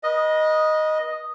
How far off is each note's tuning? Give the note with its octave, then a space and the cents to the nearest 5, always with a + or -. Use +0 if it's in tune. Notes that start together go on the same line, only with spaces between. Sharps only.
B4 -40 D#5 +0